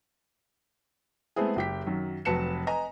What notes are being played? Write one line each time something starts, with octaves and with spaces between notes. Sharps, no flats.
G#3 A3 B3 C4 E4 G#4
F#1 G4 B6
F#2 D#3 F#3
F1 F#3 B4 A5 C#7 E7
B4 D#5 G#5 A#5